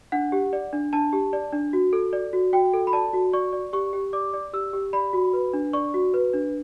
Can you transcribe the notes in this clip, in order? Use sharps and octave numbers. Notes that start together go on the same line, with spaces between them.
D4 F#5
G4
D5
D4
D4 A5
G4
D5
D4
F#4
A4
D5
F#4
F#4 G5
A4
B5
D5 A5
F#4
D5 C#6
D5
G4 C#6
G4
D5 D6
D5
G4 E6
G4
D5 B5
F#4
B4
D4
D5 C#6
F#4
B4
D4